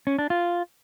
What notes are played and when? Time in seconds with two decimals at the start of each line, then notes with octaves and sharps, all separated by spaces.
0.07 C#4
0.19 D4
0.30 F4